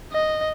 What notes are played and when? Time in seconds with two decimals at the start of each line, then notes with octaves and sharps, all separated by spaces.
0.13 D#5